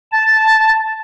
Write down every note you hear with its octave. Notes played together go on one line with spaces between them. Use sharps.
A5